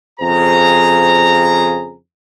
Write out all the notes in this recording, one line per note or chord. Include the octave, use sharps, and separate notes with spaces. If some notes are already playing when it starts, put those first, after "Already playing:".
F2 C#3 G#4 C5 A#5